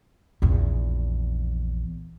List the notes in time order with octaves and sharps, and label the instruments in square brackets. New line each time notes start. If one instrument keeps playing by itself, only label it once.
[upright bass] A#1 E2